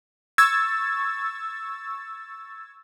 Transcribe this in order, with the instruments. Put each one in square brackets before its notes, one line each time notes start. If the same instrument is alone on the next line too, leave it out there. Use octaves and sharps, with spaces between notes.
[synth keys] C#6 E6 G#6 A6